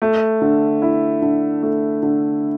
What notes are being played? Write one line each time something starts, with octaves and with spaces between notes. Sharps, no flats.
A3
D3
E4
D3
A3
D3